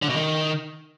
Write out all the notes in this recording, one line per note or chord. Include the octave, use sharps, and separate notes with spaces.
D3
B2
D#3